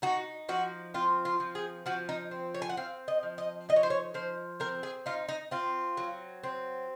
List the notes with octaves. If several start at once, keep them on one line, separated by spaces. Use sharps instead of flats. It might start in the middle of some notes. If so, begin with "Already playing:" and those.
D#4 F#4
F3 F#4
C4 F4
F4
F3
G#4
F3 F#4
D#4
C4
C#5
G#5
F#5
C4 F5
D#5
F3
D#5
D#4 D#5
C#5
C5
C#5
F3 C5
C4 A#4
G#4
D#4 F4
D#4
C4 F4
F#3
C4